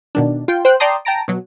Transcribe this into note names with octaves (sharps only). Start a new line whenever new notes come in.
B2 D#3 D4
F4 G5
C5 G5 F#6
D5 G5 A5 A#5 C6 D#6
G5 A5 A#5 A#6 D7
B2 F#3